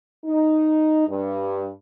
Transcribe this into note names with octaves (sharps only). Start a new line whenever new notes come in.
D#4
G2